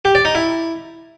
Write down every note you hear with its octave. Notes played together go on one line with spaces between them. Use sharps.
G4
D5
D#4
E4